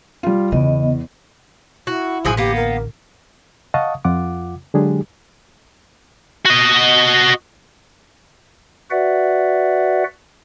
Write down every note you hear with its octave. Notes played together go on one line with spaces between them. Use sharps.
G3 F4
E2 C#3 B3 D#5
E4 F#4
A1 D3 F3 F#3 G#4
A#3 B3 G4
A#4
D#5 F5 F#5 A5 C#6 D#6
F2 F4 F#5 D6
D3 F#3 G#3 D4 G4 G#4
F#4 D#5
F#4 B4 D5 E5 F#5